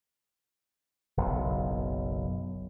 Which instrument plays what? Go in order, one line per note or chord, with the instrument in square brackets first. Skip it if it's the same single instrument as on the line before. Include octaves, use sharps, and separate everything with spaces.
[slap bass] F#1 B1